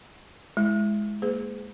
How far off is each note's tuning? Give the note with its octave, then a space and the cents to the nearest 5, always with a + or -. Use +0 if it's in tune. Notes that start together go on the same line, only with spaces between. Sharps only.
G#3 +10 E4 +0
A#3 +0 G#4 +5 C5 -45